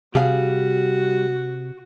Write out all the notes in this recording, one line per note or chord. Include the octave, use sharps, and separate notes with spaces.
C3 G3 F#4 G#4 F5